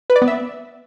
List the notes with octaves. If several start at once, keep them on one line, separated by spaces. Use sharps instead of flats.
B4
D5
B3
E5